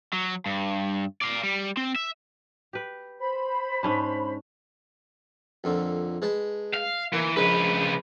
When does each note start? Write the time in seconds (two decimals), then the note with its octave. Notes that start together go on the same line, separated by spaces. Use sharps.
0.13 F#3
0.46 G2
1.21 D5 F5
1.43 G3
1.77 C4
1.96 E5
2.73 G4 B4
3.19 C5 B5
3.83 G#2 C#4 D4
5.64 F2 A#2 D3
6.22 G#3 B4 A5
6.74 F5
7.13 E3 A#3
7.37 A#1 C#3 G#3 A#4 B4